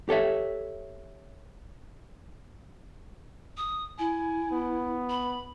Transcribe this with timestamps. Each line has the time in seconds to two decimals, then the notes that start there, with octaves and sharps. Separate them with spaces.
0.09 G4 A4 C#5 E5
3.57 D#6
3.99 E4 G#5
4.51 B3
5.10 B5